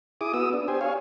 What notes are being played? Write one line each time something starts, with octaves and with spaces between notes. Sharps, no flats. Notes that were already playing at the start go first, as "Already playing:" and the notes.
E4 G#4 D6 D#6
B3 F#4 D#6 E6
D4
G4 C5 G#5
C#5 F5 G#5